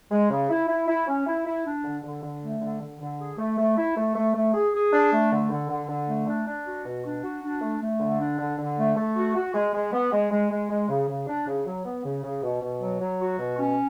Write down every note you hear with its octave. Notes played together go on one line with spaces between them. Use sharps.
G#3
C#3
E4
E4
E4
C#4
E4
E4
D4
D3
D3
D3
A3
D3
D3
D3
G#4
A3
A3
E4
A3
A3
A3
G#4
G#4
D4
A3
D3
D3
D3
D3
A3
D4
D4
F#4
B2
D4
F#4
D4
A3
A3
D3
D4
D3
D3
A3
A3
F#4
F#4
G#3
G#3
B3
G#3
G#3
G#3
G#3
C#3
C#3
D4
C#3
F#3
B3
C#3
C#3
B2
B2
F#3
F#3
F#4
B2
C#4